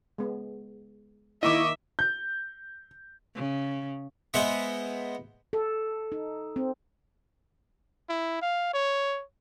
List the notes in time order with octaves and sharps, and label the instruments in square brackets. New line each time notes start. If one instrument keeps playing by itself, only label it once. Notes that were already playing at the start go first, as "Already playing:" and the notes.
[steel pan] G#3 B3
[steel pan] D#3 A#3 D#4 [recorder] E4 [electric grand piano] D#5 C#6 D6 [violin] E5
[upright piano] G6
[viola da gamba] C#3
[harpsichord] G#3 B3 C5 D#5 E5 F#5
[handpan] A4
D#4
C4
[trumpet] E4
F5
C#5